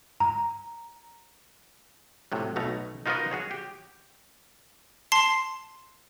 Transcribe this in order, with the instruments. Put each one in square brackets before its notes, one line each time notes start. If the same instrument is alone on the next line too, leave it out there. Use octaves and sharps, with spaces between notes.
[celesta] A#5
[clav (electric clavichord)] A2 C3 F#3
B1 B2 A3 A#5
D#4 F4 F#4 A#4 B4 D#5
F#4 G#4 C#5
G4
[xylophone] A5 C6 C7